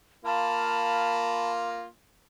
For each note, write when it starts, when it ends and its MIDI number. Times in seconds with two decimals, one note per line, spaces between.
0.25 1.85 58
0.25 1.85 65
0.25 1.52 81
0.25 1.52 83